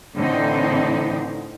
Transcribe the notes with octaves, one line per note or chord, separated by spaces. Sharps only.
A2 D3 E3 C4 D#4